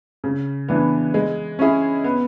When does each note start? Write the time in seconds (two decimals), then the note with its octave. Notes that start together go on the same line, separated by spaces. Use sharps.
0.24 C#3
0.68 E3 B3 D4
1.14 G#3
1.59 C#4 E4 G#4
2.04 B3